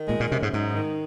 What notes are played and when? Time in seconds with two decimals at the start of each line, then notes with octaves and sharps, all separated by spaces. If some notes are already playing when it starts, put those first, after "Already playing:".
Already playing: D#3
0.08 A#2 G#3
0.20 A#2
0.31 F#2 C3
0.43 G#2
0.53 G#2 D#4
0.75 D#3